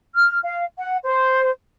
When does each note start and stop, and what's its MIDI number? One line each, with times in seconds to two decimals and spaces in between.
0.15 0.39 89
0.44 0.64 77
0.77 0.97 78
1.04 1.50 72